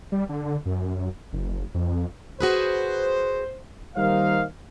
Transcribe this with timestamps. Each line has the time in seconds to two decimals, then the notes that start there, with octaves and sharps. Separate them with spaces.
0.12 G3
0.29 D3
0.66 F#2
1.33 F#1
1.74 F2
2.41 F#4 G#4 B4 C5
3.96 D#3 G3 A#3 D#4 C5 F5